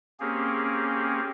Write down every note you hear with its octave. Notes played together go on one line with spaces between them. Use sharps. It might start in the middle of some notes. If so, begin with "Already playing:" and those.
A#3 C4 C#4 G4 G#4